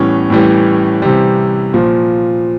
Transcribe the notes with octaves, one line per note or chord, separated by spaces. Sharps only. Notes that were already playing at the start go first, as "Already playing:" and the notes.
Already playing: A2 E3 G3 B3 C#4
A2 E3 G3
C3 E3 G3
A#2 F3